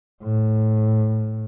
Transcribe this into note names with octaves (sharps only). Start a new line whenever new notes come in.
A2